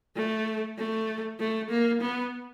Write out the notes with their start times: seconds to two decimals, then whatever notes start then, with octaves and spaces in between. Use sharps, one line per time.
0.16 A3
0.78 A3
1.40 A3
1.70 A#3
2.01 B3